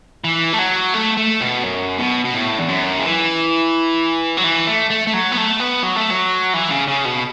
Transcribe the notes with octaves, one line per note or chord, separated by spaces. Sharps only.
E3
A3
F#3
A3
A3
B2
F#2
B2
B2
A2
E2
F#2
C#3
E3
F#3
E3
A3
A3
A3
F#3
B3
A3
B3
F#3
A3
F#3
E3
C#3
C#3
B2